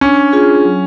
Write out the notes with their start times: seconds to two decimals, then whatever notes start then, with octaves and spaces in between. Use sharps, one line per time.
0.01 C#4 D4
0.33 F4 G#4
0.65 F#3